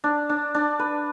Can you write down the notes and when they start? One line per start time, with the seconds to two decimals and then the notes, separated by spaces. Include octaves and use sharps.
0.04 D4
0.29 D4
0.54 D4
0.79 B4